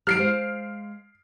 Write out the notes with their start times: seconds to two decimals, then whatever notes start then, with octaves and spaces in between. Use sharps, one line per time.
0.07 F#3 G4 A5 F6 C7 D7
0.18 G#3 C5 F5